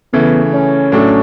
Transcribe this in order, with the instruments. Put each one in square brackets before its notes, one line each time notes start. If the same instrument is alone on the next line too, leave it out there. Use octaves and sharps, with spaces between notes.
[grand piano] C#3 E3 A3 [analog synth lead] B3
[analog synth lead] C#4
[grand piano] A2 F#3 A3 D4